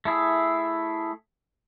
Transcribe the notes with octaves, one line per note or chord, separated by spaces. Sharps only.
A3 E4 G#4